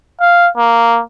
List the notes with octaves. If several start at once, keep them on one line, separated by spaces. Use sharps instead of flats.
F5
A#3